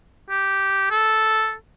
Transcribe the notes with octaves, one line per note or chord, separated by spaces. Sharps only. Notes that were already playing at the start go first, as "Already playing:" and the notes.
G4
A4